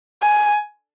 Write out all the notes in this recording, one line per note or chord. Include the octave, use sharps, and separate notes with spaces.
G#5